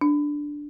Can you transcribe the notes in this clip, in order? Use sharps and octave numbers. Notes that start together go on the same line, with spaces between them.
D4